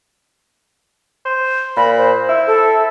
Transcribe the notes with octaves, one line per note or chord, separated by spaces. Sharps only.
C5
A#2 B5
C5
E4
A4